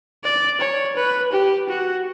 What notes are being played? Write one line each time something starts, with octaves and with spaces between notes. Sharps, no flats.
D5
C#5
B4
G4
F#4